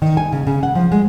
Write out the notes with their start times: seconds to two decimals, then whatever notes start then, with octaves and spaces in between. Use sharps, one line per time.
0.02 D#3
0.17 G#5
0.32 C#3
0.47 C#3
0.63 F#5
0.75 F3
0.92 G#3